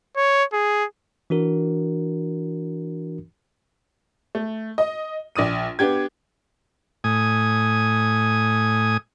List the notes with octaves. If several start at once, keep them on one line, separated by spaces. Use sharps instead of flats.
C#5
G#4
E3 D4 F#4 A#4
A3
D#5
A#1 D5 D#6 D#7
B3 D4 G4 G#6
A2 G#5 D#6